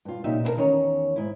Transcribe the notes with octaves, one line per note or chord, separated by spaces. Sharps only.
G2 F4
A#2 C#3 D#4 G4 E5
B2 D4 E4 A4 A#4 A#5
E2 D#3 C#4 C#5 G5 A#5
G#2 E4